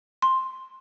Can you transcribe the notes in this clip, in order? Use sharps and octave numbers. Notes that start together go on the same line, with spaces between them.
C6